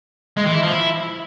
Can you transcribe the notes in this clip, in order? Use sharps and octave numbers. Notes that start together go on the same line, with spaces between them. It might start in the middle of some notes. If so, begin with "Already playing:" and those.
G#3
E3
E4
F3
E4